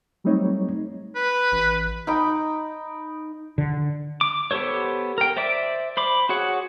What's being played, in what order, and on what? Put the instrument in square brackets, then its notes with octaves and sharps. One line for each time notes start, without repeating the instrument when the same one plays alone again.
[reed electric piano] F#3 G3 A3 C4 D#4 C#5
[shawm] B4
[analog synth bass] A1
[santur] D#4 G5 B5
[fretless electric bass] D3
[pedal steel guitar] D6
B3 G4 A4 C5 C#5
A#4 G5
C5 D5 E5 D6
C5 B5 D6
F#4 G#4 C#5 F#5